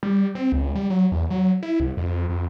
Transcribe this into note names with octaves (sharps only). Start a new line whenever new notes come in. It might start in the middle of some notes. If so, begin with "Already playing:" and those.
G3
C4
C#2
G3
F#3
E2
F#3
E4
C2
F2
F2